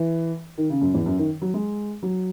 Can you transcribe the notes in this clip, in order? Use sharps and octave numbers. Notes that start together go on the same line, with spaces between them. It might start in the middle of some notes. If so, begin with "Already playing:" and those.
Already playing: E3
D#3
C#3
F#2
E2
F#2
D#3
F#3
G#3
F#3